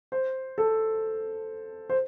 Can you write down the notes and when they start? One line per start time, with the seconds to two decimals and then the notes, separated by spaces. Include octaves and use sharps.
0.12 C5
0.58 A4
1.89 C5